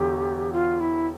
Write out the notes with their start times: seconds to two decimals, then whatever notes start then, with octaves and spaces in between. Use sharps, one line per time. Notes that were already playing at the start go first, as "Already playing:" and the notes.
Already playing: E1 E2 D3 G4
0.52 F4
0.80 E4